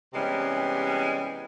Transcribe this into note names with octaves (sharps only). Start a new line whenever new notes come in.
C3 E3 G3 G#3 B3 C#4